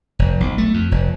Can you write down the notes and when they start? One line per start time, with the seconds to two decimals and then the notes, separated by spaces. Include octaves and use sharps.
0.19 F1
0.40 B1
0.58 A3
0.74 F2
0.91 F1